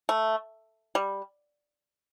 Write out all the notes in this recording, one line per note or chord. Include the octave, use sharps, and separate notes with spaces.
A3
G3